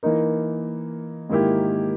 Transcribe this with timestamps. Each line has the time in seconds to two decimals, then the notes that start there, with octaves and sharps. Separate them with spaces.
0.03 E3 A#3 D#4 A#4
1.30 G#2 D#3 A#3 E4 G4